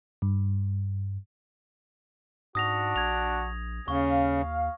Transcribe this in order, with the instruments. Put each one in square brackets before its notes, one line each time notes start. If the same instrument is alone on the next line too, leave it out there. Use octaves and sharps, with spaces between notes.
[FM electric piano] G2
[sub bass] G#2 [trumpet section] D4 F#4 [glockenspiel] D#6 A#6 F7
[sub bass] A#1 [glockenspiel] G#6 F7
[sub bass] D#2 [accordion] C#3 [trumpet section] F5 [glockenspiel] C#6